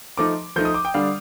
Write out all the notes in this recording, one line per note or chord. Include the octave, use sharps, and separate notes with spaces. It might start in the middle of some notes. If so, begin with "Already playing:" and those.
F3 A3 D#4 D6
F3 A3 D#4 G6
D#6
D6
G5
D3 G3 D4 F5